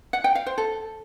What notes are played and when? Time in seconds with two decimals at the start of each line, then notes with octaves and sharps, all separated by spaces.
0.13 F#5
0.24 G5
0.35 F5
0.46 C5
0.58 A4